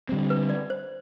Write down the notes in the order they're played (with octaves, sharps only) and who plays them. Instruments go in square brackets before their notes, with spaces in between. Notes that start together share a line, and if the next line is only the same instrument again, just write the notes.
[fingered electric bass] D3 G3 C4
[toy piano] B4
D5
C5